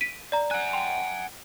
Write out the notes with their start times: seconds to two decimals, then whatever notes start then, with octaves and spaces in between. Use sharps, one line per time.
0.01 B6 D7 D#7
0.32 D5 A#5
0.51 F#5 G#5 F#6
0.73 G5 C6